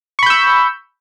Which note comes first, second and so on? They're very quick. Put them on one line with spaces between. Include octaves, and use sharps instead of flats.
C#6 B5 G6 E6